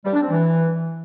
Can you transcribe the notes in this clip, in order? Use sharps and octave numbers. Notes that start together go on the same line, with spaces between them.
G3
D4
C4
E3